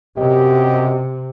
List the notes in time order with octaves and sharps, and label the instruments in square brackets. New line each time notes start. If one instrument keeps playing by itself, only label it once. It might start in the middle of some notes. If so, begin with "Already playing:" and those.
[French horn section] F#2 G4 D#5 [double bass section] C3